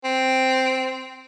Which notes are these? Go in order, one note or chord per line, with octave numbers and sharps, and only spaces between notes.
C4